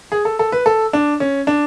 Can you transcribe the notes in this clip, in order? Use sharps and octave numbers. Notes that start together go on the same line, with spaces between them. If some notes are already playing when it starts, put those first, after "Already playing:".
G#4
A4
A4
B4
A4
D4
C#4
D4